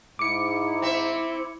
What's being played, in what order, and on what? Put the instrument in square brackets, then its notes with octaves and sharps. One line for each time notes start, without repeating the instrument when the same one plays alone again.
[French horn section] G#2 [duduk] E4 [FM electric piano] D6 C#7
[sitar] C4 E5